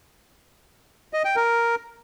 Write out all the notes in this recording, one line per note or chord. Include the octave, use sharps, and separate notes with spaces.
D#5
G5
A#4